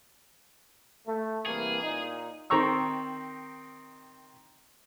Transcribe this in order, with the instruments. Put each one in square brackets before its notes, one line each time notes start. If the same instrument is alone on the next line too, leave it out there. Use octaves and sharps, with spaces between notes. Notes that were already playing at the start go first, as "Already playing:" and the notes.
[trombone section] A3
[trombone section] C2 E3 A#3 [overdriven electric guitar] G#4
[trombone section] A#2 D#4
[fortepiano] D#3 C4 A#5 C#6 E6